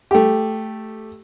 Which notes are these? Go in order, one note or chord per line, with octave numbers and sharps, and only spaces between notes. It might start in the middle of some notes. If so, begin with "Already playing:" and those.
A3 G4